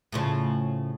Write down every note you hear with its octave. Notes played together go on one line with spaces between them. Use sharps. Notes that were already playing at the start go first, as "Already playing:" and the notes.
A2 C#3 F3